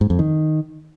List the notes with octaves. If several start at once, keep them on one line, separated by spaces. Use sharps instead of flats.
G#2
F2
D#3